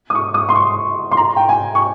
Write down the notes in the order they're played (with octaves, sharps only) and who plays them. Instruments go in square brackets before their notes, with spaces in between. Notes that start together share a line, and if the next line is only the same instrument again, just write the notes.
[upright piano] D#6
C#6
D#6
C6
C#6
C6
A#5
G5
G#5
C#6